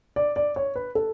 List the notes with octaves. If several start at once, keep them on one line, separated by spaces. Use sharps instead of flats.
D5
D5
C#5
B4
A4